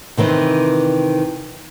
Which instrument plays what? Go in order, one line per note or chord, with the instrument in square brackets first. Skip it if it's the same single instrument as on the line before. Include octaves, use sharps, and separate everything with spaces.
[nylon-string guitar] C3 D#3 E3 C4